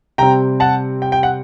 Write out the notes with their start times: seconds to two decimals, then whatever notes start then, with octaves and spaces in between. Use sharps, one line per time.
0.18 C3 G3 C4 G5 A#5
0.60 F#5 A5
1.02 G5
1.12 G5
1.23 F#5